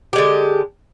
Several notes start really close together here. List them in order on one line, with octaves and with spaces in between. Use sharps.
G4 G#3 D3